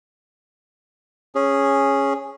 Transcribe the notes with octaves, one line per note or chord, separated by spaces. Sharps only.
C#4 G#4